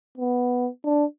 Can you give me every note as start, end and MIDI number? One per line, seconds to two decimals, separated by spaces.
0.18 0.68 59
0.84 1.05 62